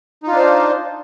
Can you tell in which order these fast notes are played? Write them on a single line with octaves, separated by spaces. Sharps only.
D#4 F4 D4 C5